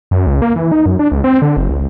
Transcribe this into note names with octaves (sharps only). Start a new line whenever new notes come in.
F#2
C#2
A#3
E3
D#4
F#2
D4
C#2
C4
D3
F#1
C#2